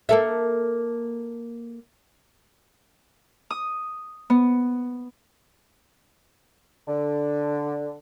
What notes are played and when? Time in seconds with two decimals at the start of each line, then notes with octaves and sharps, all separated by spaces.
0.09 A#3 A4 E5
3.50 D#6
4.30 B3
6.88 D3